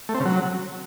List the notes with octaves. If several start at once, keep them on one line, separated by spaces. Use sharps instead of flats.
A3
C4
C#3
F#3